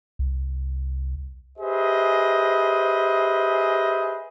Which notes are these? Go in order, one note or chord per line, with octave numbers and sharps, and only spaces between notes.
C2
G4 G#4 B4 C5 D#5 E5